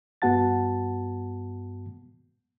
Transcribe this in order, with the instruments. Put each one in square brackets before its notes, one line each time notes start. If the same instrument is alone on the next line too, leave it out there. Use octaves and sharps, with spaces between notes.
[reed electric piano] G2 B3 F#4 F#5 A5 A6